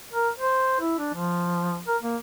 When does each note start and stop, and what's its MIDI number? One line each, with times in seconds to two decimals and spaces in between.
0.13 0.29 70
0.38 0.78 72
0.80 0.96 64
0.98 1.12 62
1.14 1.83 53
1.87 1.97 70
2.03 2.17 58